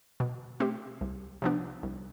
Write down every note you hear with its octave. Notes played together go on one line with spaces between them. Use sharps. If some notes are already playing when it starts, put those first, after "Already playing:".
B2
A3 C4 G4
C2
C3 F3 B3 D4
C2